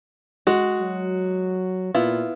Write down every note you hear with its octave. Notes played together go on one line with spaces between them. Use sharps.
G#3 F#4
F#3
A#2 B3 E4 F4